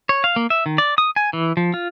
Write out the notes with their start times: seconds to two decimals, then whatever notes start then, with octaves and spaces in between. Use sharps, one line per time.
0.09 C#5
0.24 F5
0.36 A#3
0.50 E5
0.66 D#3
0.78 D5
0.98 D#6
1.16 G#5
1.33 E3
1.57 F3
1.74 F4